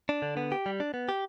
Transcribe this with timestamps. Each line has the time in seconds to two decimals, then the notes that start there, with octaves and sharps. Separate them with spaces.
0.09 D4
0.22 D3
0.37 B3
0.52 G4
0.66 G3
0.80 D4
0.94 B3
1.09 G4